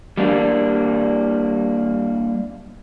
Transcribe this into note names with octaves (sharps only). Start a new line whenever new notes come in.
G3 A#3 D4